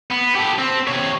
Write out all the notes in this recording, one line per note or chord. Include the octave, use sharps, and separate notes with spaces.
B3
G4 A4
C4
C3 C#5